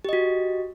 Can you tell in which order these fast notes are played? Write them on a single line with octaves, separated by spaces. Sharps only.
G4 D#5 F#4